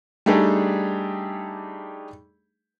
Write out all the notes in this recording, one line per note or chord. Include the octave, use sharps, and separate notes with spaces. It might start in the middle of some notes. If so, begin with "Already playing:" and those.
G3 A3 D4 D#4 G4 G#4